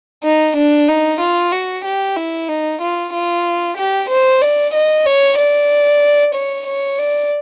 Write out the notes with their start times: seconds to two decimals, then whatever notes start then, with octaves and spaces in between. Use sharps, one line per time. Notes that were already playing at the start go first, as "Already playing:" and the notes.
0.24 D#4
0.56 D4
0.88 D#4
1.20 F4
1.52 F#4
1.85 G4
2.17 E4
2.49 D#4
2.81 F4
3.13 F4
3.77 G4
4.10 C5
4.42 D5
4.74 D#5
5.06 C#5
5.38 D5
6.35 C#5
6.67 C#5
6.99 D5